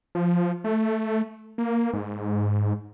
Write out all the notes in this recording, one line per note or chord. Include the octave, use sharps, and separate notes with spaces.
F3
A3
A#3
G#2